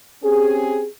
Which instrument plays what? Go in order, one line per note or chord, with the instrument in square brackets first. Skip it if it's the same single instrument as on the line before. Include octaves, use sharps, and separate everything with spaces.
[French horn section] C4 C#4 G4 G#4